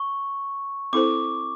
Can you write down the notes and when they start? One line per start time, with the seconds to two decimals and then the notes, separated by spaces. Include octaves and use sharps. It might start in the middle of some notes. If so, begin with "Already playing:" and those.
Already playing: C#6
0.93 C4 E4 A4 C5 D6